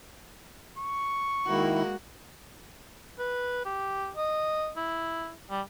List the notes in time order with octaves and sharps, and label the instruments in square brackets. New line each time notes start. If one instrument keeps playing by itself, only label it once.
[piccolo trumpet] C#6
[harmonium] D#3 E4 [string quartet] G#3 A#3 F#4
[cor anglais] B4
G4
D#5
E4
G3